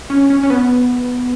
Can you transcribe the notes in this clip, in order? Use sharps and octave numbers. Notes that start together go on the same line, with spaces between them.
C#4
C#4
C#4
B3